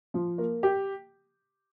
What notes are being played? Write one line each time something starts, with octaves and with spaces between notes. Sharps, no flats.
F3
A#3
G4